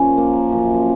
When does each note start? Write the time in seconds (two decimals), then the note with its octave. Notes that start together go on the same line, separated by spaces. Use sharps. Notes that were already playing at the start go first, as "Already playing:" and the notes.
Already playing: A#2 F3 C#4
0.18 A#3
0.50 F#2 F3